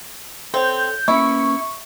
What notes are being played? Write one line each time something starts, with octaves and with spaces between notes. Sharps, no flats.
C4 A4 C#5 G6
A#3 B3 C#4 E4 C#6